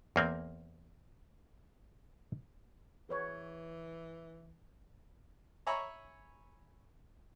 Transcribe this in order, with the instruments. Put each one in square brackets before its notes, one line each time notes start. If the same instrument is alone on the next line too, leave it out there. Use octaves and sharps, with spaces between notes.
[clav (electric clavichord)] E2 A#3 C4
[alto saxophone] E3 [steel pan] G#4 B4 C#5
[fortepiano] C#5 E5 G#5 A#5 B5 C#6